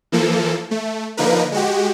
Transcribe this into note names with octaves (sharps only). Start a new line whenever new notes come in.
E3 F3 A#3 A4
A3
D3 F3 A#3 D#4 A#4 B4
G#3 F#4 G4